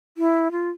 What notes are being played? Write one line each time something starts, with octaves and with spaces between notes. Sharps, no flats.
E4
F4